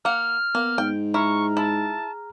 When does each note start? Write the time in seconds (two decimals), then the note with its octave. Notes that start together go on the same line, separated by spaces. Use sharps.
0.05 A#3 F#5 F6
0.55 A#3 B3
0.78 G#2 G5
1.14 E4 G#4 A#5 C#6 F6
1.57 E4 A5